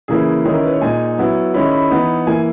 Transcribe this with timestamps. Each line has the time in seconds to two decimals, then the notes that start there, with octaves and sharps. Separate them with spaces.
0.08 C#3 E3 A#3 E4 G#4
0.45 D#3 G#3 C#4 E4 G#4
0.54 A#4
0.63 B4
0.73 C#5
0.81 A#2 G#3 D#4 G#5
1.18 F#3 B3 E4
1.54 D#3 G#3 C#4 E4 B5
1.72 B5
1.90 E3 B3 D#4
2.27 E3 A#3 E4 G#5